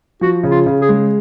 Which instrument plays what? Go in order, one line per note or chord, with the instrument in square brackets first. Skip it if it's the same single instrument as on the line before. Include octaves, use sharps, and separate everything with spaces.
[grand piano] F3 [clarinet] F#4
[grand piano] C#3
[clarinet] F4
[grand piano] C#3
[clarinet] G#4
[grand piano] G#3